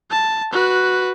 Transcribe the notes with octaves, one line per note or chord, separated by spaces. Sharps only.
A5
F#4 B4